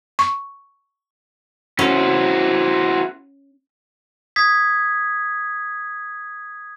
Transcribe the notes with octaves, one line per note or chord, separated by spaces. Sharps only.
C#6
C#4 E4 F#4 C5
D#6 G#6 B6